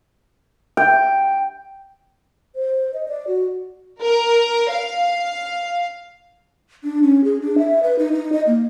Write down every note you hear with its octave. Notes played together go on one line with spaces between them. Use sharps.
G5
C5
D#5
D5
F#4
A#4
F5
D4
C#4
G#4
D4
E5
B4
D#4
D#4
D#5
A#3